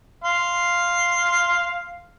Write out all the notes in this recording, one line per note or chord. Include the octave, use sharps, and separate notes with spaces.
F5 C6